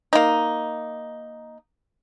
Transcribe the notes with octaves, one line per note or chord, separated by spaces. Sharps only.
A#3 D#4